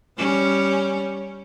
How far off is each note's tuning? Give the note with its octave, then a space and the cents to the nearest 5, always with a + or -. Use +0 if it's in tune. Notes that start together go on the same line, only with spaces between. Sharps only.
G3 +0 C#4 +0